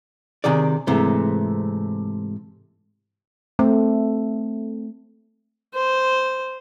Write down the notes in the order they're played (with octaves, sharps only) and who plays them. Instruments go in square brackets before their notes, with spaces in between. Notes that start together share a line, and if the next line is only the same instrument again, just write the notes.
[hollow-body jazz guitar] C3 D#3 G#4 D5
G#2 C3 E3 A3
[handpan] A3 [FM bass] C4
[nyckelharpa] C5